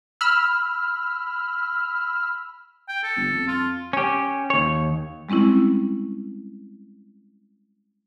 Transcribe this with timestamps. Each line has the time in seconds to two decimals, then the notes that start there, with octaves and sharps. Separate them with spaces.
0.21 B5 E6 F6
2.88 G5
3.03 A4
3.17 G1
3.33 F2
3.47 F4
3.93 C#4 G4
4.50 D#2 C#5
5.29 G3 G#3 C4 C#4 E4